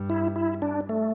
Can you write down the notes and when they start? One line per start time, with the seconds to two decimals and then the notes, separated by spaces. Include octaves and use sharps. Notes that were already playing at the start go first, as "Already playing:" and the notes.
Already playing: G2
0.10 E4
0.36 E4
0.62 D4
0.89 A3